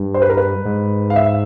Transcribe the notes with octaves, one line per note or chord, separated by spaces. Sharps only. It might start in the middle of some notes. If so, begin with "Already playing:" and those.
Already playing: G2
C5
B4
A#4
B4
G#2
F5
E5